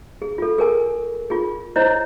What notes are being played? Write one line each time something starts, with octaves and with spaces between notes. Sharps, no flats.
G#4
F4 A4
G#4 A#4 G#5
F4 G#4
E4 C5 C#5 D#5 A#5